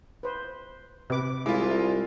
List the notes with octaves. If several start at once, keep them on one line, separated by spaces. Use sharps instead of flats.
B4 C5
C3 B4 D6
C2 G#3 E4 F4 E5 D6